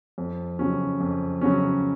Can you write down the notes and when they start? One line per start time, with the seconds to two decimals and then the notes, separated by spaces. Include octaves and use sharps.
0.18 F2
0.59 C#3 F#3 C#4
1.00 F2
1.41 C#3 F#3 C#4